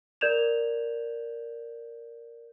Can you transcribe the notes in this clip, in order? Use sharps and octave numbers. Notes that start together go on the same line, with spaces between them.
A#4 D5 G6 G#6 E7 F7